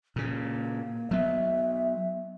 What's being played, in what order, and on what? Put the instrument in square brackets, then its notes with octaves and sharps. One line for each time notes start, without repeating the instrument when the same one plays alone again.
[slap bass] A#2 C#3 [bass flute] A#3
[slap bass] F#3 B3 [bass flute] E5